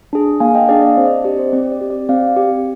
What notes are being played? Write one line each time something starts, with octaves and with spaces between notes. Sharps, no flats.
D4 G#4
A#3 F5 G#5
D#5 G5
D4 G#4 D5 F5
D5
C4 C5
D#5
D5
G4 D5
C5
C4 D5
D5
G4
D5
C4 D5 F5
G4